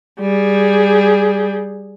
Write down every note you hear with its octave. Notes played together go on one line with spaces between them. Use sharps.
G3 G#4